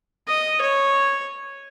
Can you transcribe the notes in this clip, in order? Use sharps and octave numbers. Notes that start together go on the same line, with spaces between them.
D#5
C#5